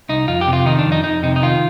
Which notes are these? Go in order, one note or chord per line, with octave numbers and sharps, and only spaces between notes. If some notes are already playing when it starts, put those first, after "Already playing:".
C2 D#4
F2 F4
G4
C3
F4
D#3 D#4
D4
F2
D#4
F2 D#4
C3 D#4
D#4
D#3 F4